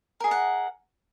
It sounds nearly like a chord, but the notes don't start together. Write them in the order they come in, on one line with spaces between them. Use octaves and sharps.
A#4 G#4 D#5 F#5